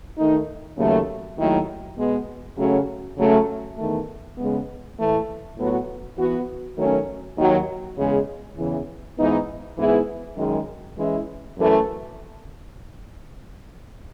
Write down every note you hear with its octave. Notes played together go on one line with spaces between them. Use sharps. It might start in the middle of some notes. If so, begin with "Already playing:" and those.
D#3 A3 D#4
D#2 C#3 F#3 A3
D#2 D#3 F#3 A3 E4
B2 G#3 B3
C#3 F#3 A3 C#4 F#4
C#3 F#3 A3 C#4
E2 D#3 A3
C#3 G#3 B3
A2 E3 A3
A2 F#3 B3 F#4
E3 B3 F#4
D#3 F#3 A3 C#4
D#2 D#3 F#3
E2 C#3 G#3
E2 C#3 E3
G#2 E3 B3 D#4
G#2 E3 B3 E4 G#4
F#2 D#3 G#3
E3 G#3 C#4 E4
F#2 E3 A3